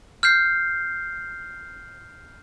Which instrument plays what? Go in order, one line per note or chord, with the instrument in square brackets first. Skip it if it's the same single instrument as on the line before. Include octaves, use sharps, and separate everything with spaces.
[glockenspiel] F6 G6 C7